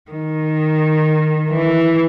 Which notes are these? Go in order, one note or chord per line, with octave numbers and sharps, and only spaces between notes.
D#3
E3